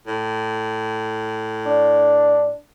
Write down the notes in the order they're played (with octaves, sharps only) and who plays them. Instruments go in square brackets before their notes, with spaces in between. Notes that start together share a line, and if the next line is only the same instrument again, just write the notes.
[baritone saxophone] A2
[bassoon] D4